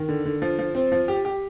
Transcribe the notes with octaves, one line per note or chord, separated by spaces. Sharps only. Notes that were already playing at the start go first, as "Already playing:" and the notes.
Already playing: D#3
D3
D3
F3
F3
C4
F3
G4
G4